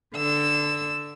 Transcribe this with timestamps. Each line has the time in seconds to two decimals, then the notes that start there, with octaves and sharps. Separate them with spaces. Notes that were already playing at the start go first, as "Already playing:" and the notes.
0.16 D3 E6